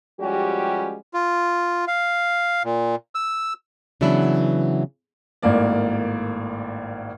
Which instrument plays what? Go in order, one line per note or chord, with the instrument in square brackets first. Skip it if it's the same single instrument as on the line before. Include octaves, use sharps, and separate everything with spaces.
[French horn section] F3 G3 G#3 C#4 F#4 G4
[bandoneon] F4
F5
A#2
E6
[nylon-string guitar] C#3 E3 F#3 B3 D4 E4
[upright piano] G#1 A2 A#3 D5